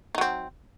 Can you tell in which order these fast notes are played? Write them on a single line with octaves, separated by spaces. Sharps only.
D#4 F#3 C4